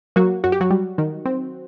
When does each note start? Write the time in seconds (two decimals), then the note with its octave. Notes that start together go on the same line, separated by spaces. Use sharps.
0.16 F#3 A#3 F#4
0.44 F#2 F#4
0.52 G4
0.61 F#3 F#4
0.71 G3
0.98 D#3
1.26 C4